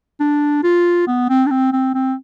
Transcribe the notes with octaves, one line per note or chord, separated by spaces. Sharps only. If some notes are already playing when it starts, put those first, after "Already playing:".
D4
F4
B3
C4
D4
C4
C4
C4